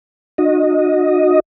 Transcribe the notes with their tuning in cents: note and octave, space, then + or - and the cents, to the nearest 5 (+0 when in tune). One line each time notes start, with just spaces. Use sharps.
D4 +40 F#4 -30 D#5 +0